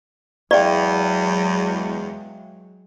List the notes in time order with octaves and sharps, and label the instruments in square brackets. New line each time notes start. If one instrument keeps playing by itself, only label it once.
[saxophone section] E2 [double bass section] F#3 G#3 [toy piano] D5 [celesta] E5 F5 G5